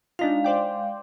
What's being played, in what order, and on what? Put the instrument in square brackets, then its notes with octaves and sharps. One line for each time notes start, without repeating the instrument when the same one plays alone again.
[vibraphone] G#3 F5 [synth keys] D4 D#4 F4
[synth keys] C5 D5 G5